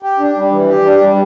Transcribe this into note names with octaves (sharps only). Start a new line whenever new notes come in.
G4
D4
G3
E3
G4
D4
G3